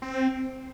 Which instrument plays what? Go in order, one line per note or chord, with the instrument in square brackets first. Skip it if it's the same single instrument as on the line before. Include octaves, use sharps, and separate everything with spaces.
[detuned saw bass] C4